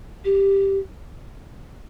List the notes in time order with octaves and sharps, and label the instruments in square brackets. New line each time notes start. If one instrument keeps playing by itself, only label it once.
[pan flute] G4